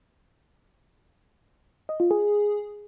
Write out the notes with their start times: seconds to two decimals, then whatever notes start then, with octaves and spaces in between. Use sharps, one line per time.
1.89 D#5
2.00 F4
2.11 G#4